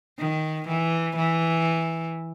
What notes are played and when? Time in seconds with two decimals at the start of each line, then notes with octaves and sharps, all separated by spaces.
0.19 D#3
0.68 E3
1.16 E3